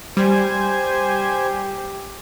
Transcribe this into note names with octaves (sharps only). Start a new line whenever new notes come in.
G3 G4 C5 G#5